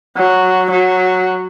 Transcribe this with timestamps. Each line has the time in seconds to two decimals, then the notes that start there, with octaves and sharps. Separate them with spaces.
0.17 F#3
0.71 F#3